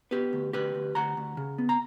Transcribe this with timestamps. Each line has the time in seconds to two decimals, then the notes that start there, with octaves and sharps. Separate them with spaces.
0.11 B3 G4 B4
0.33 D2
0.53 D2 G4 B4
0.75 D2
0.95 D2 F#5 A#5
1.17 D2
1.37 C#3
1.58 B3
1.69 A#5